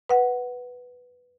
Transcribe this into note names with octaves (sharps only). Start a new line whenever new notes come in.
B4 F#5